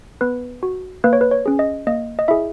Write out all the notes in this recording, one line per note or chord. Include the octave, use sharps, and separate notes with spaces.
B3 B4
F#4
A#3 B4
C#5
B4
C#5
C#4 G#4
D#5
A#3 D#5
D#5
E4 G#4 E5